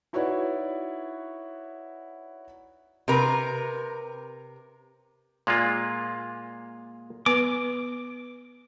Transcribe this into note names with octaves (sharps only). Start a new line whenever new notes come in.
D#4 E4 F#4 B4 C#5 D5
C3 A#4 B4
A#2 G#3 A#3 F4
B3 B4 D6